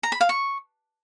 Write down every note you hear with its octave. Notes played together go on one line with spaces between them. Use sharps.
A#5
B5
F5
C#6